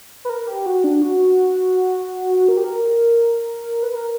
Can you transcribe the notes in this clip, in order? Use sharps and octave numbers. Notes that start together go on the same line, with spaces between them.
B4
A#4
G4
F#4
D4
F#4
A#4
G4
A#4
B4
A#4